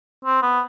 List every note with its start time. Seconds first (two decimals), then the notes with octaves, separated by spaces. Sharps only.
0.25 C4
0.42 B3